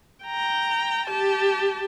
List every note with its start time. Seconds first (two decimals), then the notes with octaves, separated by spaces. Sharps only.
0.25 G5 A#5
1.07 G4 A5